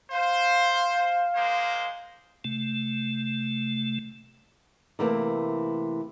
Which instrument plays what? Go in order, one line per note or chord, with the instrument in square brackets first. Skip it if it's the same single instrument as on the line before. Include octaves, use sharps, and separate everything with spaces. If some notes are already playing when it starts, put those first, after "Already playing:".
[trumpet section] C5 [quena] F5
[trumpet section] G#3 A#3 C5
[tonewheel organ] C3 A3
[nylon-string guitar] C3 E3 A3 A#3